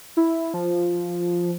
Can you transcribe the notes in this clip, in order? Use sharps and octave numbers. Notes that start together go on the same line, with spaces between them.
E4
F3